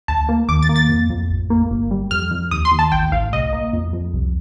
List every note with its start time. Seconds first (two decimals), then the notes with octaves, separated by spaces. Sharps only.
0.08 D2 A5
0.29 A#3
0.49 D#2 D6
0.63 A6
0.69 A#3
0.76 A6
0.89 F2
1.10 F2
1.30 A1
1.50 A#3
1.71 G1
1.91 G3
2.11 F2 F6
2.31 F2
2.51 D#2 D#6
2.65 C6
2.72 D#2
2.79 A5
2.92 A1 G5
3.12 A1 F5
3.33 C2 D#5
3.53 A#3
3.73 F2
3.93 F2
4.14 C2